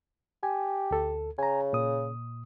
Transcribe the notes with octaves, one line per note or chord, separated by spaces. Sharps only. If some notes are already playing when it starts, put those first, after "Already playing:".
G4 G#5
D2 A4
C#3 G#5 A#5
A#2 D#6